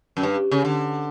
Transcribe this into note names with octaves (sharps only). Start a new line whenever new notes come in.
F#2
G2
C#3
D3